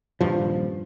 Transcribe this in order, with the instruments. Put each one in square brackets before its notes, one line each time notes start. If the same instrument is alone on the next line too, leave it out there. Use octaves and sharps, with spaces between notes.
[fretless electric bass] D#1 G2 F3